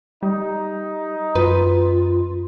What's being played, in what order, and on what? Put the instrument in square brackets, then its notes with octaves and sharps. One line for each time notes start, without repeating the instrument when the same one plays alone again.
[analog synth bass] G3 [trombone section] D#4
[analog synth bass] F#2 [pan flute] F4 [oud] B4